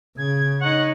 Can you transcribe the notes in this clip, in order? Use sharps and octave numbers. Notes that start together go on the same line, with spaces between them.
C#3 G#6
D#4 C#5 F#5